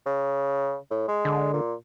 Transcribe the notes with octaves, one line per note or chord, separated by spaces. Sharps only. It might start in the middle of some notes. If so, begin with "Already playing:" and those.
C#3
A2
G#3
D3
A#2